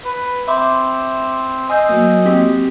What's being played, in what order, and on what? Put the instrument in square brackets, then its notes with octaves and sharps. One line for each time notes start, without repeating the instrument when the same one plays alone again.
[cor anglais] B4
[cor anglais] C4 [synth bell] E5 B5 D6
[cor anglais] D#5 [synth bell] G#5 E6 G6 [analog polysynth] C7
[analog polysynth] F#3 A#3
[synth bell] C4 G4